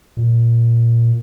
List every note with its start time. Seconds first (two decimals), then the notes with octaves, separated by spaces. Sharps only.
0.17 A#2